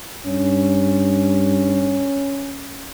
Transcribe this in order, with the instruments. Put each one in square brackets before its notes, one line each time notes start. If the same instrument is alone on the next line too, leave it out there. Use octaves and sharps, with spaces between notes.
[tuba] G2 [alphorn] C#4